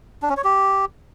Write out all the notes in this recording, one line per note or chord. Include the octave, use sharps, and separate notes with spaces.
D4
C#4
C#5
G4